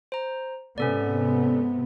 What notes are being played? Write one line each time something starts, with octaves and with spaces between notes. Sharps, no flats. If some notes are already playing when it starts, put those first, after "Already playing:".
C5 A#5
G#2 C3 B3 C#4 A4 D5